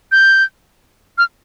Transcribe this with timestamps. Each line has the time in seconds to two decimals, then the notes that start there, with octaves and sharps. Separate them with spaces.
0.12 G6
1.18 F6